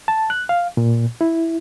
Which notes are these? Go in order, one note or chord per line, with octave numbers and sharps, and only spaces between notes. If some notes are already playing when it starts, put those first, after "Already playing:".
A5
F#6
F5
A#2
E4